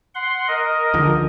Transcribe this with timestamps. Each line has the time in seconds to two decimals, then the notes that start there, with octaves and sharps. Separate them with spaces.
0.15 F#5 C6
0.48 A#4 D#5
0.94 C#2 D3 F3